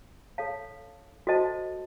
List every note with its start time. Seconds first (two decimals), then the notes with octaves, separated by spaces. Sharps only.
0.38 A4 C#5 F5 A5
1.27 F#4 A4 C5 D#5 A5